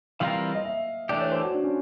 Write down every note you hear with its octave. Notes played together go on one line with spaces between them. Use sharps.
E3 G3 C4 F4 A#4 F5
D#5
E5
E3 A3 D4 G4 D5
C#5
C5
F#4
D4
C#4